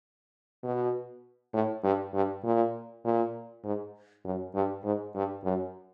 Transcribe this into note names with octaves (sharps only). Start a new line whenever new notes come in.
B2
A2
G2
G2
A#2
A#2
G#2
F#2
G2
G#2
G2
F#2